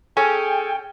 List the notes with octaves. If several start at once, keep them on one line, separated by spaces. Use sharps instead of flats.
C#4 G#4 A4 G5 G#5